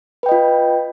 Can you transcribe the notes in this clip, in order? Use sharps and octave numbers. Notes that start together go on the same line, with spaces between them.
F4 B4 D#5 G5